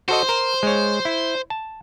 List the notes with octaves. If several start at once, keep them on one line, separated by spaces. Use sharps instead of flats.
F#4 A4 C5 D#5
A#4
G#3 C#5
E4
A5